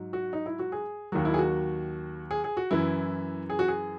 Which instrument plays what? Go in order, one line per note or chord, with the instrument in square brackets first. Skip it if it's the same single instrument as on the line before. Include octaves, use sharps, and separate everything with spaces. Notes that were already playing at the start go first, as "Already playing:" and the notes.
Already playing: [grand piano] G#2 F#3
F#4
D#4
E4
F#4
G#4
D#2 D#3 F#3 F#4
E4
G#4
F#4
G#4
G#4
F#4
F#2 E3 E4
G#4
F#4
G#4